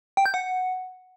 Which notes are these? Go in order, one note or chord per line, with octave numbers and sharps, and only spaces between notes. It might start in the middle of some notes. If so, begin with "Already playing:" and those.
G5
G6
F#5